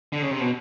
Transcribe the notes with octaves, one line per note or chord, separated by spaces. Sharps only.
D3
C#3
C3
B2